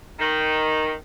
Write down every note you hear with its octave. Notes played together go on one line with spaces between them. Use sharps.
D#3